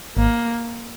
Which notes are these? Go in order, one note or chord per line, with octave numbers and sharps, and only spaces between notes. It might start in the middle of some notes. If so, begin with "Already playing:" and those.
G#1 A#3